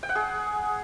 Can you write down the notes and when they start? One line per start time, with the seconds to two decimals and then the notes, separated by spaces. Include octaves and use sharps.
0.03 G5
0.09 F#5
0.15 G#4